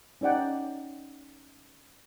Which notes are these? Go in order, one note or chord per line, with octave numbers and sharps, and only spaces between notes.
C#4 D#4 D5 F#5 G5